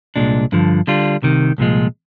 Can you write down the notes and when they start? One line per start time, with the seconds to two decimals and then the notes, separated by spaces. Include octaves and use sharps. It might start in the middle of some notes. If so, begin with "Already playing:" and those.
0.16 C2 A#2 G#3 D4
0.52 G2 D3 F3
0.87 D3 G3 D4 F4
1.22 C2 C3 D#3
1.58 C2 A#2 F3 G#3